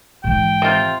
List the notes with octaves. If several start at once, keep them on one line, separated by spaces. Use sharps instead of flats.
G#2 E3 G5
C3 F4